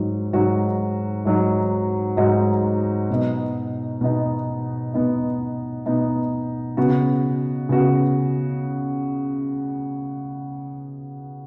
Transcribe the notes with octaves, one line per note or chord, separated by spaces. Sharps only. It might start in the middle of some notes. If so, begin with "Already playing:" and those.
Already playing: G#2 F#3 D#4 F#4
G#2 F#3 D#4 F#4
G#2 F#3 D#4 F#4
G#2 F#3 D#4 F#4
B2 B3 D#4
B2 B3 D#4
B2 B3 D#4
B2 B3 D#4
C#3 B3 F#4
C#3 B3 F#4